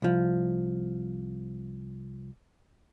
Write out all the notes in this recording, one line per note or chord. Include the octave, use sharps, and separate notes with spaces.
C2 F3